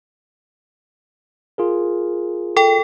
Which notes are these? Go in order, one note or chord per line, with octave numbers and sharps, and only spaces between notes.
F4 G#4 A#4
A4 G5